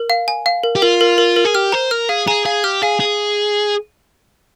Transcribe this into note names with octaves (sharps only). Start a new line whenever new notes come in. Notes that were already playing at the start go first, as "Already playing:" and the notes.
Already playing: A#4
F5
G#5
F5
A#4
G4
F4 A#4
A#4
A#4
A#4
G#4
G4 F6
C5 A#5
A#4 F6
G#4 F5
G#4 A#5
G#4 F5
G4 F6
G#4 F5
G#4